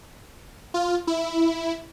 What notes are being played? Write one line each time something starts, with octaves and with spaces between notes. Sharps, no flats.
F4
E4